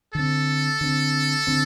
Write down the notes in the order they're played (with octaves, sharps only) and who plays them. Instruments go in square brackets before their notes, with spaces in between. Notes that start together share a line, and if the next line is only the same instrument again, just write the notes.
[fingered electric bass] D3 C4 [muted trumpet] A4
[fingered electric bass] D3 C4
D3 C4